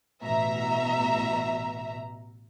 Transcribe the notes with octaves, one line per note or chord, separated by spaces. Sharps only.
A1 B2 E5 A#5